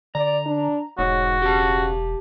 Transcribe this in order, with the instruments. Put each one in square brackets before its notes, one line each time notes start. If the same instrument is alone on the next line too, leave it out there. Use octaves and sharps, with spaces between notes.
[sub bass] D3 [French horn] D5 [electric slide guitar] A#5
[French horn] D4
[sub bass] E1 [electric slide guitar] G#2 [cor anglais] F#4 [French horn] C#5
[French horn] C#3 [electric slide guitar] G4 A5